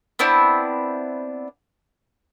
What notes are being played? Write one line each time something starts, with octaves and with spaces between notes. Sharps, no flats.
B3 C4 D4 E4